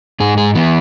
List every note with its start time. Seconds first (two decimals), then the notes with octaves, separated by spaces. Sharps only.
0.20 G#2 G#4
0.38 G#4
0.55 E3 B3